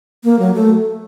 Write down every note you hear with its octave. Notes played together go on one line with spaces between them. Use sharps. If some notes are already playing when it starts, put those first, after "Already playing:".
A#3
F#3
A3